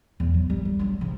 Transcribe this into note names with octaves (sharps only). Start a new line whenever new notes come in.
E2
F#3
G3
G3
F#3 D4
C#3 F3